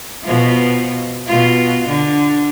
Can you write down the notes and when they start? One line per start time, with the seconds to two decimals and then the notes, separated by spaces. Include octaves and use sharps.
0.24 B2 F3
1.27 B2 F4
1.89 D3